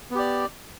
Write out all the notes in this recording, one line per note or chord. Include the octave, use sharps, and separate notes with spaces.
B3 G4 D5